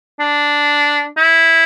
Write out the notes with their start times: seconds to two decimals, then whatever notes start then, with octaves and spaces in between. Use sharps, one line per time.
0.20 D4
1.18 E4